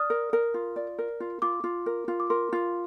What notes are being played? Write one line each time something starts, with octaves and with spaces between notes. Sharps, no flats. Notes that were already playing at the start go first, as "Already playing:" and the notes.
Already playing: D5 D#6 F6
A#4
A#4
F4
D5
A#4
F4
F4 D6
F4
A#4
F4
D6
A#4 C6
F4